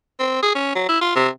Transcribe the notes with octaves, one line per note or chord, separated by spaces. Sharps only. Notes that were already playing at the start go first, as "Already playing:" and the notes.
C4
G#4
C#4
F#3
E4
F4
C3